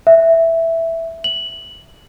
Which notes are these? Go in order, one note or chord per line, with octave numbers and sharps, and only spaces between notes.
E5
F#7